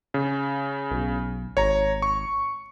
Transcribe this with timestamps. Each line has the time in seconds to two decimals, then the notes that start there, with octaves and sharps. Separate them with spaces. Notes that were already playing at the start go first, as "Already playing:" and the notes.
0.14 C#3
0.91 B1
1.57 G#1 C#5 A#5
2.02 C#6